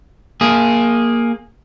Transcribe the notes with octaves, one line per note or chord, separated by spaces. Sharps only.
A#3 G#4